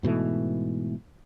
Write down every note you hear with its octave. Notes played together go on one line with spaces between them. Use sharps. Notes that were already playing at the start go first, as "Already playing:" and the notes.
G#2 B2 E3 A3